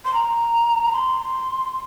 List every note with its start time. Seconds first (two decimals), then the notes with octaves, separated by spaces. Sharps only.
0.05 C6
0.14 A#5
0.92 C6